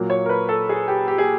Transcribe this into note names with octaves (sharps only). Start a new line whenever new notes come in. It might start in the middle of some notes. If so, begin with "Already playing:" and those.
Already playing: A#2 F#3 A#3
C#5
A#4
B4
A4
G#4
G4
G4
G#4